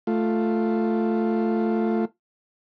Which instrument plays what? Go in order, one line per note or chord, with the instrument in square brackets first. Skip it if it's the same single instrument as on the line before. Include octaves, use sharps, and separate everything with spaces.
[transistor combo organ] A3 F4